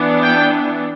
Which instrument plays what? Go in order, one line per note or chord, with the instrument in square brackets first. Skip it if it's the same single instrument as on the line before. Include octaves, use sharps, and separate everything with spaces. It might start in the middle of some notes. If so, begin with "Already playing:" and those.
Already playing: [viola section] E3 B3 D4
G5